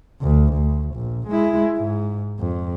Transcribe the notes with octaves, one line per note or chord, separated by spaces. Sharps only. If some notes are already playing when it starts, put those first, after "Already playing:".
D2
D2
A#1
G#3 E4
G#2
F2